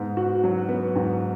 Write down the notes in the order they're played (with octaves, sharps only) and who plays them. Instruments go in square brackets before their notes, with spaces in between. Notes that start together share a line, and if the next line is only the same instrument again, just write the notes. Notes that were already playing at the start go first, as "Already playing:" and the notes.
Already playing: [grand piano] G#2 B3
F#4
F#3
B3
G#2